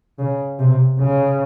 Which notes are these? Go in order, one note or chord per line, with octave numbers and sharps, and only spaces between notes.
C#3
C3
C#3